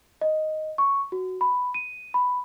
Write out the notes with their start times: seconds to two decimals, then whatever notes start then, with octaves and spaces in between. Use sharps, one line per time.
0.21 D#5
0.78 C#6
1.12 F#4
1.41 B5
1.74 D#7
2.14 B5